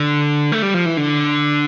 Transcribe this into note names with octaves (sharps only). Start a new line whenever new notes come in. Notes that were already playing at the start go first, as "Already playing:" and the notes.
Already playing: D3
A3
G3
F3
E3
D3